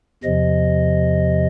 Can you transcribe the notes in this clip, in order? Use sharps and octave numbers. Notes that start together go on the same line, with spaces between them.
E2 C3 F3 D#5